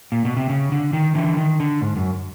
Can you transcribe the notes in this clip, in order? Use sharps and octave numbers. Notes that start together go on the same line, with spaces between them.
A#2
B2
C3
C#3
D3
D#3
D3 E3
D#3
D3
G#2
F#2